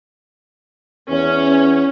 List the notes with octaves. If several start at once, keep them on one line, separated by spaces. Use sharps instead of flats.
E2 C#4